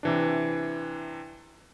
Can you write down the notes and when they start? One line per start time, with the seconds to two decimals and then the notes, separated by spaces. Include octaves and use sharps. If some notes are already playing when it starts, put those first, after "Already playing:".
0.03 C3 E3 D4